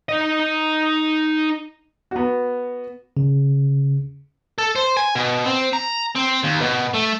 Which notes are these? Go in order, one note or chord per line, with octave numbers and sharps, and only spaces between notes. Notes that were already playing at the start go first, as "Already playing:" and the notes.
D#4 D#5
B3 F#4
C#3
A4
C5
G#5
B2
C4
A#5
C4
D#2
B2
A3